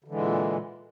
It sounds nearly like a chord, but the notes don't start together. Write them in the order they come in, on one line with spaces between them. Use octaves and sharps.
D3 E3 G#3 A#2